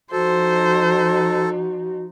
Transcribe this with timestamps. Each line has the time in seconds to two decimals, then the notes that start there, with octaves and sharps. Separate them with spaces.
0.12 F3 D#4 F#4 A4 C5